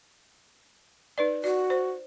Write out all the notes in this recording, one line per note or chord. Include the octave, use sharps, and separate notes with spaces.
D#4 B4 D5
F#4 D5
C5